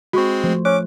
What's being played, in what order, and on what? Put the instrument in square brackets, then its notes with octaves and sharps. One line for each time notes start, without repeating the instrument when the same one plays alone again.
[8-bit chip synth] G#3 C4 [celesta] F#4 C#6
[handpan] F3 A3 C5
[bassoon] C#4 [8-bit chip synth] D6 [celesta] F#6